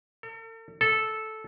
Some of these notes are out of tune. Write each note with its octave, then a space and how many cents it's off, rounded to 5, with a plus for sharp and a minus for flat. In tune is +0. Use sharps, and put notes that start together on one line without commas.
A4 +45
A4 -10